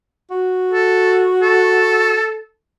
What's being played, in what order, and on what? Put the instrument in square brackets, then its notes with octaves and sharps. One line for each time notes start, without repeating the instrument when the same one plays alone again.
[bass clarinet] F#4
[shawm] A4
A4